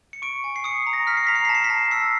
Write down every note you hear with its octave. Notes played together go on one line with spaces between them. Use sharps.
C#7
C#6 D7
G#5
C7
D#6 C#7
A#5
A#6
F6 B6
C7
A#5 B6
C7
A5 B6
C7
B6
A5
E6 C7